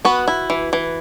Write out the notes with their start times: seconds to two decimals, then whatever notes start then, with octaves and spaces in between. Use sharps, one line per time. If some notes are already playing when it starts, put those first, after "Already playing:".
0.05 B3 F#4 B4
0.28 E4
0.50 E3
0.73 E3